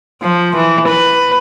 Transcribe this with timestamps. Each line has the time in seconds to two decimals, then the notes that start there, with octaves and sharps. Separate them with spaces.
0.22 F3
0.56 E3
0.88 B4